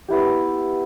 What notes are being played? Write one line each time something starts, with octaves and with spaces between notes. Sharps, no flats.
B3 E4 G4